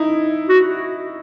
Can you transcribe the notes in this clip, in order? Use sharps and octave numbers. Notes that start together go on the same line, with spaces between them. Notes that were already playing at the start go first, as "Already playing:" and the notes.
Already playing: D#4 E4
F#4